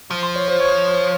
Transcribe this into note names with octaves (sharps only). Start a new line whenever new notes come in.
F3
C6
C#5
C5
C#5